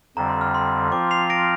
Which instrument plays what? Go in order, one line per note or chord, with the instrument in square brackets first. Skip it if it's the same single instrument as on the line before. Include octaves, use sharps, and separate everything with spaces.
[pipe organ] F2 D3 G3 C4 [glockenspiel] A#5
[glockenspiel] C6
F6
C6
[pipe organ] F3 C4 F4 [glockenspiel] D6
[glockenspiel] C7 F7
A#6 D7